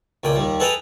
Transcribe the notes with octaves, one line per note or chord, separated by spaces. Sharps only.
C#2 A#2 G5
D#2 G3
G#4 A4 B4 D#5 G5 A#5